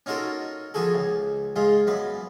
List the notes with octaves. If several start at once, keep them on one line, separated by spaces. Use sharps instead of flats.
C#4 D#4 F4 F#4 A4 A#4
F3 B3 F#4 G#4 A4
C#2
G#2 G#3 F4
F#2 B3 B4